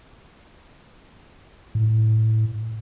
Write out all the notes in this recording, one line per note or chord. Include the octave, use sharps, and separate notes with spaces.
A2